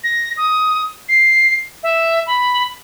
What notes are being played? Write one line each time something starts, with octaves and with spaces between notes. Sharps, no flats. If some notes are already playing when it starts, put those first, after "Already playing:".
A#6
D#6
C7
E5
B5